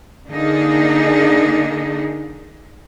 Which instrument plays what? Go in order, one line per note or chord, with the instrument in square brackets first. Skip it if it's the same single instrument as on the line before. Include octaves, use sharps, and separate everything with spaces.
[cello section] D3 A#3 D4 D#4 G#4